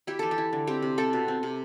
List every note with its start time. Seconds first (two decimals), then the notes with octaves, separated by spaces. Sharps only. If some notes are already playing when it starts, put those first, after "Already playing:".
0.07 E4 G4
0.19 E3 A4
0.31 G4
0.38 E4
0.53 D3
0.67 C4 G4
0.82 C3
0.98 C4 A4
1.13 B2
1.28 C4
1.43 C3